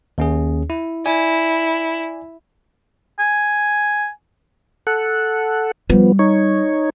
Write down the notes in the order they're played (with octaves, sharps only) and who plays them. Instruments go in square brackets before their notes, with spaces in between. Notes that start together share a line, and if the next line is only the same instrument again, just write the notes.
[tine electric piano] D#2 C#4 G#4
E4
[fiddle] E4 [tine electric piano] D5 G#5
[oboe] G#5
[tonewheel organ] A4 F#5
[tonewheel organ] F3 B3 [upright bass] G3
[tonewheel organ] D#4 C#5